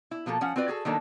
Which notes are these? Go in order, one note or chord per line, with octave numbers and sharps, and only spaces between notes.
E4
B2 F3 A#3 G4 A4
F3 C#4 F#5
C4 F4 F#4 B4 D5
F#4 G#4 A4
D#3 F#3 A#3 D4 A4